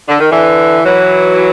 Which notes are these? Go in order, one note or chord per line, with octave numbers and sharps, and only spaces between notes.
D3
D#3
D3 E3
E3 F#3